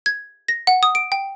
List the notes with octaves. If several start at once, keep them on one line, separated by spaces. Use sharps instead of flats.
G#6
A#6
F#5
D#6
D7
G5